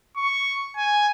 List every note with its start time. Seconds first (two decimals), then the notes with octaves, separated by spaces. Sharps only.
0.17 C#6
0.76 G#5